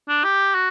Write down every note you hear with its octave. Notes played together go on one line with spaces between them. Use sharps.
D4
G4
F#4